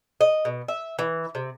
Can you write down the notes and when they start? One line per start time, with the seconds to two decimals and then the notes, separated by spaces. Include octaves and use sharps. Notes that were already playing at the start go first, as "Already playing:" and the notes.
0.21 D#5
0.45 B2
0.68 E5
0.99 E3
1.35 C3